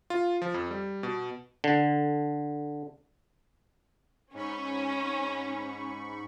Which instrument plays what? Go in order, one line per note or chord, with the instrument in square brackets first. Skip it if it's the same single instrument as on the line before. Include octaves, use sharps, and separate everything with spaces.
[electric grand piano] F4
F3
F2
G3
B2
[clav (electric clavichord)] D3
[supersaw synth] G#2 B5 C#6 [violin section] C#4